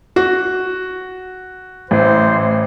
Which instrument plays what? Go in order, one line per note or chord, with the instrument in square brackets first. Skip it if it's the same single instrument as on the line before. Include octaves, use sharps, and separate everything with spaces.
[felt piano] F#4
[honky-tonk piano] A1 [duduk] C5